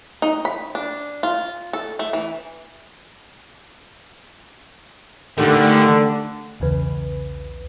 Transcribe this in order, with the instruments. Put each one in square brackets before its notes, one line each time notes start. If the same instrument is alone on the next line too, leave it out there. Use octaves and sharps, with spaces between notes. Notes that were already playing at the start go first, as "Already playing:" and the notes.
[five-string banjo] D#4
B5
D4
F4
A4
A3
E3
[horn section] D3 [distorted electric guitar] D#3 G3 [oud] A3
[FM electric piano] B1 E2 C#3 B4